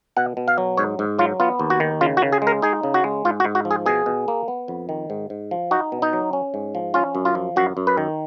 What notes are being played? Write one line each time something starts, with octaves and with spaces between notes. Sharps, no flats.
B2 F#5
B2
F5
F#3
G#2 C#5
G#2
F#3 F4
B3 F4
D#2
F#4
D#3
C#3 F4
F#4
C#3
G#4
G#3
A#4
D#4 G#4
C#3
F#4
G#3
G#2 F4
F#4
G#2
F#4
F3
G#4
B2 G#4
B2
A#3
B3
F2
D#3
G#2
G#2
F3
D#4 F#4
B2
D#4
F#3
C#4
G#2
F3
C#4 F4
F#2
F4
F3
F#2 F#4
F#2
B4
D#3